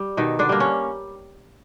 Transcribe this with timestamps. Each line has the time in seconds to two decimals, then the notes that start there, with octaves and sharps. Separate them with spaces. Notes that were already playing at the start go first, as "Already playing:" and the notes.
Already playing: G3
0.17 B2 D#3 D#4
0.39 D3 D4
0.49 G3 A#3
0.60 C#4